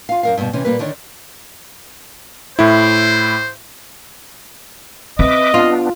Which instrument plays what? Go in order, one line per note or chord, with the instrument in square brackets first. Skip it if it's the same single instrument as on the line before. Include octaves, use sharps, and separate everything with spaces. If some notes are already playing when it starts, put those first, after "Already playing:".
[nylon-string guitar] F4 F5
F#2 A#4 F5
G2 B2
C3 E3 C#4
A#2 G3 A#3 B4
D3 D#3 D4 C#5
[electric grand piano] A2 E4 [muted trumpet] C5
[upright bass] C4 [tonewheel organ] B4 E5 D6 [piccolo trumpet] D#5
[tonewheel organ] B3 D4 [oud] F4